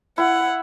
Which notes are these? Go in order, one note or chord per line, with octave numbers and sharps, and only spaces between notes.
E4 F#5